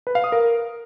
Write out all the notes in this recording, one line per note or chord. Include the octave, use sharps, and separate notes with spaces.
B4
F5
D#6
A#4